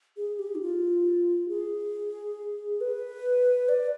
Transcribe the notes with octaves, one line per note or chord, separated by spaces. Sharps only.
G#4
G4
D#4
F4
G#4
B4
D5